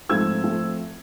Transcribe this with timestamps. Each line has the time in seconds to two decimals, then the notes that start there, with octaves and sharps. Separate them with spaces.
0.09 G#2 F3 A3 C4 E6 G#6
0.44 F3 A3 C4